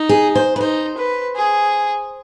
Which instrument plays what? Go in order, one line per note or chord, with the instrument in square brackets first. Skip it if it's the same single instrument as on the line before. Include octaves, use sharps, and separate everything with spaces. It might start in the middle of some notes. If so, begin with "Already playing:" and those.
Already playing: [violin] D#4
[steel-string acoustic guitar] G#4
C5
B4
[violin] D#4 [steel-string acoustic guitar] C5
[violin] B4
G#4